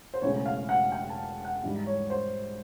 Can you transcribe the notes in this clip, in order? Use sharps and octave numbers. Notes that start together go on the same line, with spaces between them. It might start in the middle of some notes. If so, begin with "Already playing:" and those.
C5
E1 E2 C#3 E3 A3 C#5
F5
F#5
G5
A5
F#5
G#2 E3 G3
C#5
C5